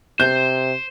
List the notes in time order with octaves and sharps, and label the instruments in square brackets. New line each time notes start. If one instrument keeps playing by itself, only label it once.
[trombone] C3 [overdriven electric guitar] C5 [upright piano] G6